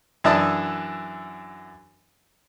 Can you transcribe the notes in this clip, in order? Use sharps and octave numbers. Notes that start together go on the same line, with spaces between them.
F#2 E3 D4 E5 A5 D#6